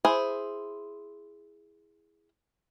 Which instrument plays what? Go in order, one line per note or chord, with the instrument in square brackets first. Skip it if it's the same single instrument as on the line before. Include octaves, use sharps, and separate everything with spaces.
[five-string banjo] E4 G#4 C5